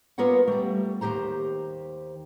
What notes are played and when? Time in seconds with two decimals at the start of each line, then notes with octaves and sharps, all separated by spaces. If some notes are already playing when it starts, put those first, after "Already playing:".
0.18 A#3 B3 F4 A#4 C#5 F#5
0.47 G3 A3
1.01 D#2 D#3 G4 C5 A#5